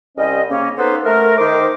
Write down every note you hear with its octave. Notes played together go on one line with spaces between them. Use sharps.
C2 G3 C#4 C5 D#5
C#3 A#3 C#4
B3 C#4 D#4 A4 B4 C5
A3 A#4
D#3 C5 D6